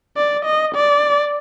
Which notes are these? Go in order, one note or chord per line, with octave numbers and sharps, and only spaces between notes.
D5
D#5
D5